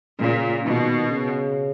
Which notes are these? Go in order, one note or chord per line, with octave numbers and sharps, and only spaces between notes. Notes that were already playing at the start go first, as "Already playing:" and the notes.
A#2 C#3
B2 D#3
C#3